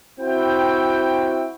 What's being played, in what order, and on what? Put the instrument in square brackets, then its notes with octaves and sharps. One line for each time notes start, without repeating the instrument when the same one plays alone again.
[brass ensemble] C4 E4 F#4 G5